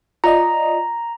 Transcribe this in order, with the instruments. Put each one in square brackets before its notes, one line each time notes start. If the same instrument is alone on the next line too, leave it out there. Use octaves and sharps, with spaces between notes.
[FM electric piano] F4 D5 D#5 [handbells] A#5